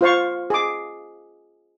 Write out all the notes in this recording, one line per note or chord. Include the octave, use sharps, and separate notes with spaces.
F4 C5 F5 C#6
G#4 D6